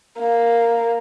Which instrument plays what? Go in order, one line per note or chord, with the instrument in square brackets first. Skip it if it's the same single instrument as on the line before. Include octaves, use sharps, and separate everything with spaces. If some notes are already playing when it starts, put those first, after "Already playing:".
[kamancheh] A#3